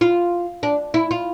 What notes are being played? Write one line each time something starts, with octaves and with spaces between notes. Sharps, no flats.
F4
D4
E4
F4